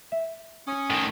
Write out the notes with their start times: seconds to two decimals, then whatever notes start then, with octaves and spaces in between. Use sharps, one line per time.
0.12 E5
0.68 C#4 G#5 D#6
0.90 A2 D#3